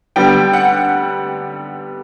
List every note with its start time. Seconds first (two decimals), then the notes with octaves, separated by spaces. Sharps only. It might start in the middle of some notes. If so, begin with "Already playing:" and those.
0.16 D3 G3 B3 G5
0.53 F#5